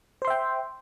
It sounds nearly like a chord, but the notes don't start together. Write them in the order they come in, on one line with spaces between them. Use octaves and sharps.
C5 C6 E5 G5